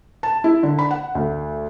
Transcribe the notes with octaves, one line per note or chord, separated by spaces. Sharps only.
A5
E4
D3
B5
F#5
D2